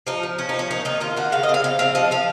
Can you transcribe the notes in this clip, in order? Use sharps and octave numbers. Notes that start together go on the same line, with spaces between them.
F3 D#4
F3
F3 C#4
C4 D#4
C#4
A#3 D#4
D#3 D#4
D#3 F4
A#3 F#4
C#3 F5
D#5
C4
F5
C#3 F5
C4 F5
F3 D#5
F3 F5